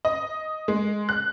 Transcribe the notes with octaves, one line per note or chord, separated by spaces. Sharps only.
D#5
G#3
F#6